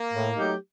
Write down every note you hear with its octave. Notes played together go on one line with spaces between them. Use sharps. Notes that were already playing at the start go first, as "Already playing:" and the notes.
Already playing: A#3
A2
F#3 A3 D#4 G4